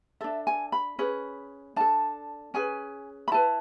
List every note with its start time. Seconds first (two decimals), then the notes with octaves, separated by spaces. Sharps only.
0.21 D4 A4 E5
0.47 G#5
0.72 B5
0.99 C#4 G#4 B4
1.76 D4 A4 A5
2.54 C#4 G#4 B4 G#5
3.28 B5
3.32 E4 B4 A5